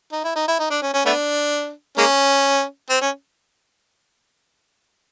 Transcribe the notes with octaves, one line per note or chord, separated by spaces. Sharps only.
D#4
E4
D#4
E4
D#4
D4
C#4
C#4
A3 B3 D4
G#3 A#3 C#4
C4
C#4